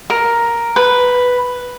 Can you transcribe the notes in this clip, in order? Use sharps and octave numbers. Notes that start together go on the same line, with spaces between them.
A#4
B4